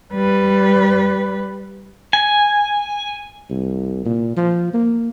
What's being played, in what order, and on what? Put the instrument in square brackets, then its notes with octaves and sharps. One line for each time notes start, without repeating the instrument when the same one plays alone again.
[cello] G3 B4
[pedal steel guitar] G#5
[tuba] C2
A#2
F3
A#3